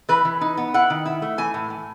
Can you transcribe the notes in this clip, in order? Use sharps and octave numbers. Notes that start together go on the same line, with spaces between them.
E3 B4
E3
D#4
B3
E4 F#5
D#3
E4
A3
E3 G#5
A2
A2